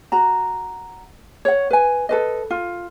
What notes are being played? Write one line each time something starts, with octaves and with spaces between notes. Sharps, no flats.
F#4 A#5
C#5 F#5
B4 G#5
A4 B4 D#5
F4